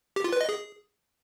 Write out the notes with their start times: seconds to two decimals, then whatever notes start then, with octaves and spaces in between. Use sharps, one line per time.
0.16 G4
0.24 F4
0.32 B4
0.41 D#5
0.49 G#4